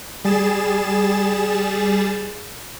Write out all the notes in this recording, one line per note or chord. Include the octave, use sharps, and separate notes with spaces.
G3 G#4 A6 E7